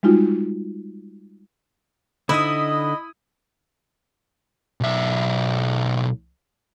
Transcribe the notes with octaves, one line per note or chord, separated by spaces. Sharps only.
G3 G#3 D#4 F4 F#4
D3 D#4 E4 D#5 B5 D#6
B1 E5